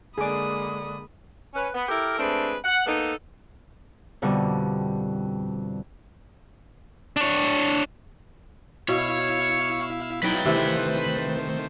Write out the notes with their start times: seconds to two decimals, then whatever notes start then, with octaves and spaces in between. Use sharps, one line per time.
0.18 D3 G#3 A#3 D4 G#4 B5 D6 D#6
1.55 C#4 B4
1.75 B3
1.89 E4 G4 A4 A#4
2.19 G#3 A3 C4 D4 B4
2.64 F#5
2.87 A#3 B3 D#4 A4
4.22 F2 B2 D3 G3
7.17 D4 C#5
8.88 B2 E4 C#5 F5 E6
10.23 F#3 D#4 E4 B4 G5
10.45 C3 D#3 E3 A3 C5